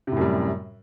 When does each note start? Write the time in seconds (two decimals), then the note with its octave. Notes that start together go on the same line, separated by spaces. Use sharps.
0.07 C3
0.12 A2
0.17 F#2
0.21 G3